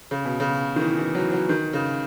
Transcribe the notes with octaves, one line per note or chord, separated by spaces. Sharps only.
C#3
B2
C#3
D#3
E3
E3
F#3
F#3
D#3
C#3